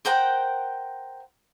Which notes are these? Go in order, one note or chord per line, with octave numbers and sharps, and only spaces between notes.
A#4 C5 F#5 G5